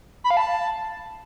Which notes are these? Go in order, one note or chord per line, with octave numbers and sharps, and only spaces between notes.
B5
F5
A5